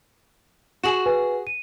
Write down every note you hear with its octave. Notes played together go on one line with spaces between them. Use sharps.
F#4 G#4 E7 F#7
B4 G#5
D#7